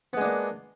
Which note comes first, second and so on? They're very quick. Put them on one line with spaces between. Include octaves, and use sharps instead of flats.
B3 G#3 D4 A#3